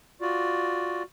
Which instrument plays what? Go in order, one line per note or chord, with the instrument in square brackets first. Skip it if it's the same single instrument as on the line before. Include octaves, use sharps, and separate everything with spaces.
[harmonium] F4 F#4 D5